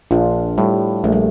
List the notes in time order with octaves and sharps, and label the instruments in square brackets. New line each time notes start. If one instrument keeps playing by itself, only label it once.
[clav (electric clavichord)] A#1 [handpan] D4 F4
[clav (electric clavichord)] A2 F3 [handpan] G3
[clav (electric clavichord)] A#1 [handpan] A3
[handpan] G3